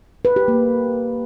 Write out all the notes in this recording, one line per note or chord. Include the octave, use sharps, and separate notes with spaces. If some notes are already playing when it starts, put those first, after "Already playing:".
B4
G4
A#3